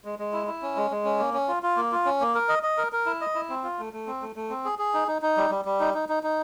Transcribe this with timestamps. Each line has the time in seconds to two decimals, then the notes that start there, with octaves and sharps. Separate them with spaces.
0.05 G#3
0.19 G#3
0.33 E4
0.47 E4
0.62 C#4
0.76 G#3
0.91 G#3
1.05 C#4
1.19 A#3
1.34 C#4
1.48 F4
1.63 F4
1.77 A#3
1.92 F4
2.05 C#4
2.21 A#3
2.35 A#4
2.49 D#5
2.63 D#5
2.78 A#4
2.92 A#4
3.06 E4
3.21 D#5
3.35 E4
3.50 C4
3.64 F4
3.79 A3
3.93 A3
4.07 C4
4.22 A3
4.36 A3
4.50 C4
4.65 G#4
4.79 G#4
4.94 D#4
5.08 D#4
5.22 D#4
5.37 G3
5.50 G3
5.65 G3
5.80 D#4
5.94 D#4
6.09 D#4
6.23 D#4